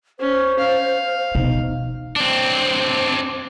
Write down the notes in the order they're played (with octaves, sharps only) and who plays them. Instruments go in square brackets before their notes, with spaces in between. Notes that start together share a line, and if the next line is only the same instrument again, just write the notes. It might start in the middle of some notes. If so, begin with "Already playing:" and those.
[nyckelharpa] C#4 [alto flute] C5
[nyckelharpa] F5
[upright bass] B2 [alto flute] D#4
[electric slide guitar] C4 D4